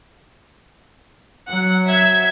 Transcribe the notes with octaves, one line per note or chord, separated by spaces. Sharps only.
F#3 F#5
E5 G#6